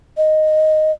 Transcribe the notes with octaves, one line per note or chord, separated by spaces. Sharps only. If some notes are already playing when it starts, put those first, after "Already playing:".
D#5